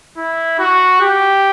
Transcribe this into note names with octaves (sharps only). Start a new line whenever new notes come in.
E4
F#4
G4